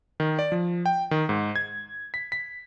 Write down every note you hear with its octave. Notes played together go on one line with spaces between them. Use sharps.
D#3
D5
F3
G5
D#3
G#2
G#6
B6
B6